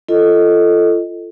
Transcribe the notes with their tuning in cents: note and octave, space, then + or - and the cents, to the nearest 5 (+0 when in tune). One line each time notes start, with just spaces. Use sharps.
F4 -25 A4 +0 D#5 +0